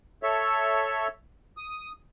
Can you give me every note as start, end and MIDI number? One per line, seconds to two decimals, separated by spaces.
0.23 1.08 69
0.23 1.08 73
0.23 1.08 76
1.57 1.92 87